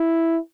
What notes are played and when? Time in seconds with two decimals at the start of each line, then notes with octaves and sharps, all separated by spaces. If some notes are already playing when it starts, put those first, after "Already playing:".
Already playing: E4